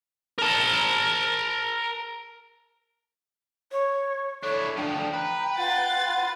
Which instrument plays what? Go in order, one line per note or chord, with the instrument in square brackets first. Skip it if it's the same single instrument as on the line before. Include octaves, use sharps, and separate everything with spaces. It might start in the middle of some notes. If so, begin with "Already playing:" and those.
[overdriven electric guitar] A#4 A5
[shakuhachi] C#5
[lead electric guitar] D4 E4 [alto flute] A4 [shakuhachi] C#5
[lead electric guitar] D2 F3 [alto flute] D4 [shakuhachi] G5
[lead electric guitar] B4 [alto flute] A#5
[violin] F4 A6 [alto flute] F#5